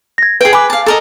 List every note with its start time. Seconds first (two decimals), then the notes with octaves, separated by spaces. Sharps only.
0.18 G#6 A#6
0.41 G#4 B4 G5
0.53 B4 G#5 D6
0.70 F5 A5
0.86 A4 A#4 D#5